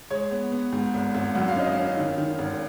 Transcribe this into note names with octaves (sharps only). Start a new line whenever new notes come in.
G#3 C#5
B3
B3
G#2
G#1
G#1
F#2 F#5
F5
C#4 D#5
C#4 F5
D#3
D#3
G#1